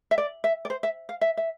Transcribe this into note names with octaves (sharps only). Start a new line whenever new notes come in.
E5
D5
E5
D5
C5
E5
F5
E5
E5